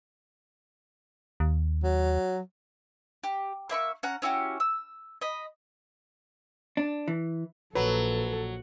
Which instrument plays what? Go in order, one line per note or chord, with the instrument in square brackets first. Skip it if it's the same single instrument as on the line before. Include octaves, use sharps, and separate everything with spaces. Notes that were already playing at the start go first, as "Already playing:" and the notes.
[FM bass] D#2
[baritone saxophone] F#3
[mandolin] G4
A#3 E5 B5 C#6
C#4 F#5 A#5
C#4 E4 F#4 G4
E6
D#5 B5
[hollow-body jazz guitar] D4
E3
[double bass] A#1 [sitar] F#3 [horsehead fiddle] A4 [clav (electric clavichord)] B4